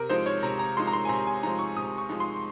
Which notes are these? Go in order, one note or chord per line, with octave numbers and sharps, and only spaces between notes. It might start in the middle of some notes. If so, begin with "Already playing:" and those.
Already playing: C3 A#4
F3 G#3 D#4 C5
C#5
C3 A#5
A#5
F3 G#3 D#4 C6
A#5
C6
G#5
C3 A#5
G#5
F3 G#3 D#4 A#5
C#6
C3 D#6
C#6
F3 G#3 D#4
C6